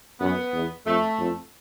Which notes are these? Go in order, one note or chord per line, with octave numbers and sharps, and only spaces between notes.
F#2 B3
E2
F2 A3
F2